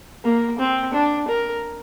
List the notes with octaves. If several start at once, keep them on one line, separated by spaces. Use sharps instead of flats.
A#3
C4
D4
A#4